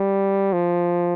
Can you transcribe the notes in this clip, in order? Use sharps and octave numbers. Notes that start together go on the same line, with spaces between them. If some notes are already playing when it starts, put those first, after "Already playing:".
Already playing: G3
F3